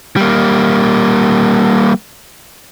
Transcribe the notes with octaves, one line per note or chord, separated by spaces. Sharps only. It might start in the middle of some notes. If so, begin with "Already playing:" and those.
G3 A#3